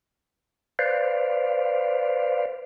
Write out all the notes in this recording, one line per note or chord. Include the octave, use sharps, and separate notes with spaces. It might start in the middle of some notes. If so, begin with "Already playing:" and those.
B4 C5 D5 F5